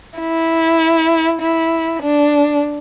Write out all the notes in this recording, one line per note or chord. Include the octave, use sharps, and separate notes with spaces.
E4
E4
D4